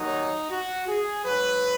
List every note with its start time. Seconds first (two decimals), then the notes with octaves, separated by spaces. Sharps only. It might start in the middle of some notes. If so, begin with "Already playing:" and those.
Already playing: D#2 D#3 F#3 D#4
0.51 F#4
0.88 G#4
1.25 G#2 F#3 B4